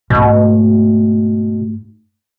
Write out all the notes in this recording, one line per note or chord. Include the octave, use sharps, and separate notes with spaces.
G#2 B2 A3